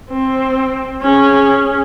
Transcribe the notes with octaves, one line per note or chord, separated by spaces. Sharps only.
C4
C#4 G#4